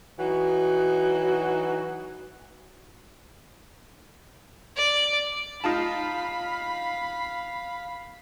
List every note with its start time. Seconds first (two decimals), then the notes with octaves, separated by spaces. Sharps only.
0.18 E3 F#3 D#4 F#4
4.76 D5
5.64 D#4 F4 F5 A5 B5